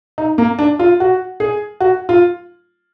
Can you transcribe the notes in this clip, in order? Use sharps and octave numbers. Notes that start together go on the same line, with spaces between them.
D#4
A#3
D4
F4
F#4
G#4
F#4
F4